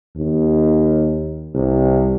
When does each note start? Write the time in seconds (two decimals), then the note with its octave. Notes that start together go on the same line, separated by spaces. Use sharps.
0.17 D#2
1.55 C2